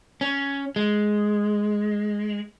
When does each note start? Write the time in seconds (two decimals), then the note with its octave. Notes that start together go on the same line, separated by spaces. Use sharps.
0.21 C#4
0.76 G#3